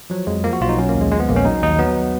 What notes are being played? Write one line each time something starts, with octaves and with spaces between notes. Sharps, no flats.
F3 F#3
F2 G#3
F3 A#3
F#4
B1 F4
D#4
F#3 C#4
A#3
D#2
G#3
F3 G#3
B3
A#1 A#3
C#4
F#3 D#4
D#2 D#4
F#3 B3